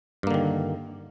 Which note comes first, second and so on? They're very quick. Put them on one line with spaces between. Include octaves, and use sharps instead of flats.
G2 A#3 D3 D#3